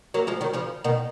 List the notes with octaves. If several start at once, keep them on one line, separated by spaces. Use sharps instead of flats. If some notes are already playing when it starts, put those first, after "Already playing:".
F#3 A#3
F3 G#3
D#3 F#3
C#3 F3
B2 D#3